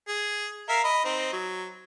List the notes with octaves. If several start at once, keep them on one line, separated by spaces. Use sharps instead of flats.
G#4
A#4 E5 F5
D#5 B5
C4 D#4
F#3